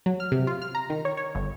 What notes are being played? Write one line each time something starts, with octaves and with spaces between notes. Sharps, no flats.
F#3
F6
C3
F4
F6
A#5
D#3
C#5
C#5
G1